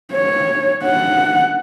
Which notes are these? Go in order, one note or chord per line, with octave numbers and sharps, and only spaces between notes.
C#5
F#5